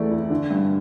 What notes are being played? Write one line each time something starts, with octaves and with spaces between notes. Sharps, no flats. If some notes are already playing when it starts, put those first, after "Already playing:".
Already playing: E2 E3 A3 D5
E4
D3
G2